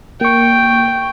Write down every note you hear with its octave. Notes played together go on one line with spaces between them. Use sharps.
A#3 G5 C#6